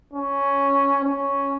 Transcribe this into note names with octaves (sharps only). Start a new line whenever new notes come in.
C#4
C#4